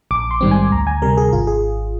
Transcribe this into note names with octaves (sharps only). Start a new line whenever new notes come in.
A#1 D6
C6
G#2 D#3 G3 C4
G#5
D2 A#5
G#5
C3 G3 A#4
G#4
G#1 F4
G#4